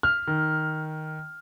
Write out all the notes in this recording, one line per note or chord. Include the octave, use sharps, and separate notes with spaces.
F6
D#3